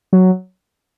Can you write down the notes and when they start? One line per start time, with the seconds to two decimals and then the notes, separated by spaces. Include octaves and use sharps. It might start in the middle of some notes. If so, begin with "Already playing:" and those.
0.13 F#3